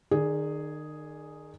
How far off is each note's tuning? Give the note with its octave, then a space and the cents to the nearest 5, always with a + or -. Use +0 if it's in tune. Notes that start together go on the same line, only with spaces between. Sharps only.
D#3 -30 G#4 +0 D5 +0